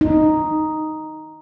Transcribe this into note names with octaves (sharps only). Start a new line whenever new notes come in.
D#4